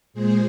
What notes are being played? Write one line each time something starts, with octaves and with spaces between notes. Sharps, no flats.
A#2 G#3 G#4 C5